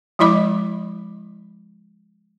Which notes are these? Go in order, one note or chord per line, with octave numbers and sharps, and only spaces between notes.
F3 G#3 E4 D#5 B5 D6